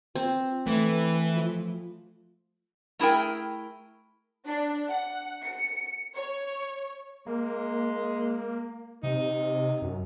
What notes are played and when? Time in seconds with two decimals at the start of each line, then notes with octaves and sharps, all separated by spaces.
0.15 C4 F4
0.66 E3 A3 B4
1.33 F3
2.99 A3 E4 G#4 A#4 G5
4.46 D4
4.89 F#5
5.44 C#7
6.15 C#5
7.26 G#3 A#3
9.03 C3 D#4
9.82 F#2